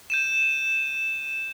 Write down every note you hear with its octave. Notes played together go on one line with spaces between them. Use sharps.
G6 D#7 E7